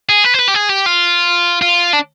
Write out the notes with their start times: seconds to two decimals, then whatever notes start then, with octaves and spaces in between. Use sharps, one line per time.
0.09 G#4
0.25 B4
0.34 C5
0.39 B4
0.48 G4
0.55 G#4
0.70 G4
0.86 F4
1.62 F4
1.93 D4